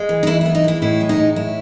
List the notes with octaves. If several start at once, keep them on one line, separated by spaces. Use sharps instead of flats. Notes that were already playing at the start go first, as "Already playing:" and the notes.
Already playing: G#3
E3
D#4
E3 E4
E4
B3
D#4
G#3 E4
A2 E4
G#3
D#4
A2
A2 E4